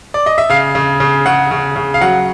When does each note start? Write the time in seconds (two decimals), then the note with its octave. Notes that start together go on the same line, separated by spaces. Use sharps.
0.14 D5
0.26 D#5
0.38 E5
0.50 C#3 F5
0.75 C#3
1.00 C#3
1.26 C#3 F#5
1.51 C#3
1.76 C#3
1.94 F5
2.01 F#3 F#5